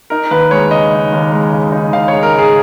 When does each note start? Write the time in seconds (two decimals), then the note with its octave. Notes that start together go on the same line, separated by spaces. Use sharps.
0.10 D#4 A#4
0.31 D#2 B4
0.51 G#3 C#5
0.71 C#3 D#5
0.92 D#4
1.12 D#2
1.32 G#3
1.52 C#3
1.72 D#4
1.92 D#2 F5
2.08 G#3 C#5
2.23 A#4
2.33 C#3
2.39 G#4